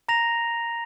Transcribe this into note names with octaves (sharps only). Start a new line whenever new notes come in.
A#5 A#6 F7